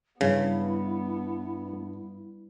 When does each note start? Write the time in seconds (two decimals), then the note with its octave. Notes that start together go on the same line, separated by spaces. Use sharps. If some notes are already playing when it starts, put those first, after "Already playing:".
0.21 G2 C#3 B3 E4